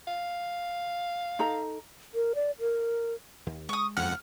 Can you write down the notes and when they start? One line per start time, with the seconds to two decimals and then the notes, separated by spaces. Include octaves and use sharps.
0.07 F5
1.39 D#4 A4 A#5
2.14 A#4
2.35 D5
2.60 A#4
3.46 D#2
3.69 G#3 C#6 D#6
3.97 F2 F#5 F6